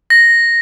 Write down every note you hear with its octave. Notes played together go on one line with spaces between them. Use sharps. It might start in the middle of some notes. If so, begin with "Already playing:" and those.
A#6